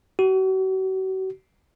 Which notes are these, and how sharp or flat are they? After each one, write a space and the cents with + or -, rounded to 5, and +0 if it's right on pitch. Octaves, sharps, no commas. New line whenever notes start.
F#4 +40